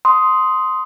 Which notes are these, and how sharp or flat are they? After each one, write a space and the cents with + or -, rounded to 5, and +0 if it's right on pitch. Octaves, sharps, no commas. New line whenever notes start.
C6 -5 D#6 +10